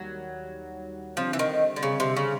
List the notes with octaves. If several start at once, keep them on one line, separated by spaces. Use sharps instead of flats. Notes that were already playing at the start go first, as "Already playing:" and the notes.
Already playing: D#2 D#3 F#3 G3
D3 F3 G3 C4
E3
D#3
D3
C#3
C3
C#3